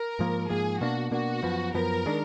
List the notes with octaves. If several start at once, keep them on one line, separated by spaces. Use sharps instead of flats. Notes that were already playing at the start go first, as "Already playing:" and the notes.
Already playing: A#4
G#2 F3 A#3
G#2 F3 A#3 G#4
B2 A#3 D4 F#4
B2 A#3 D4 F#4
F#2 F3 B3
F#2 F3 B3 A#4
D#3 G#3 D4